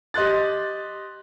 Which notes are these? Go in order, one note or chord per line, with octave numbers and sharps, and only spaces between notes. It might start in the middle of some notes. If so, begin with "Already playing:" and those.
G4 D#5 C6 F#6 A6